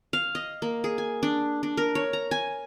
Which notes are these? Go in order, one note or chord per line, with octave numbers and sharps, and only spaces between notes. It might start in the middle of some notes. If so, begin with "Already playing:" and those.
F5
D#5
A#3
G#4
G#5
D4
D4
A#4
C#5
A#5
G#5